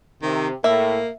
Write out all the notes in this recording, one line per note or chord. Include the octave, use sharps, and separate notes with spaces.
C3 D#3
A2 A#3 E5